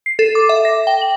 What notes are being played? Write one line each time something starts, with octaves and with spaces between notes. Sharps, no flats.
C7
A4
D6
E5
A#6
G5
F#7